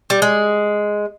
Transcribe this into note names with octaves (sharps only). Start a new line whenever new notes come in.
G3
G#3